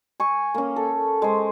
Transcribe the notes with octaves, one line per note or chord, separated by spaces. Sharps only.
G#5 C#6
A#3 C#4
A4
G#3 C5